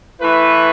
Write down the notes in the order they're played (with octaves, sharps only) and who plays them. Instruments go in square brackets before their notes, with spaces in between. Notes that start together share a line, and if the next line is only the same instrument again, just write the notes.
[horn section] E3 A3 E4 B4